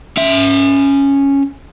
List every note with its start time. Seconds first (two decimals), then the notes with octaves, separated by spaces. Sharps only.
0.17 C#4 E5